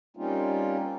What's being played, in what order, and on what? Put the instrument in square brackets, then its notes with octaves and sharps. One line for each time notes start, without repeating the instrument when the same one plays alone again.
[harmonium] G3 A#3 C4 C#4 D#4 F4